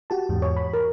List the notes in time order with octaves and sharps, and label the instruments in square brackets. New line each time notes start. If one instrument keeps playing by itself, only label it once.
[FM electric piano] F#4 G4 A5
E2 G#2
[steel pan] C#5
[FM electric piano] B5
[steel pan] A#4